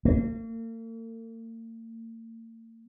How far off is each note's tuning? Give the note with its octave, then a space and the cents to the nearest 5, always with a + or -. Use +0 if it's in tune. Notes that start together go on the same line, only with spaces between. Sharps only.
A#3 -45